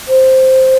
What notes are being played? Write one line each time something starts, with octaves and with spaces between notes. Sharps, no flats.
C5